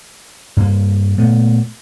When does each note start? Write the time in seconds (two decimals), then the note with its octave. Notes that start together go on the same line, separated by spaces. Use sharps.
0.57 G2 A#3
1.18 A#2 A3 B3